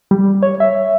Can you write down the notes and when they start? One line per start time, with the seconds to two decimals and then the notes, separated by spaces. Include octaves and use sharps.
0.11 G3
0.43 C#5
0.60 E5